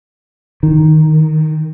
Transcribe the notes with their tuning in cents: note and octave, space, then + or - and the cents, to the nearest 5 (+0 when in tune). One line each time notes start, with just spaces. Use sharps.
D#3 +0